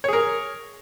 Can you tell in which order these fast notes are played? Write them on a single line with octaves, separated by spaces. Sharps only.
C#5 G#4 A#4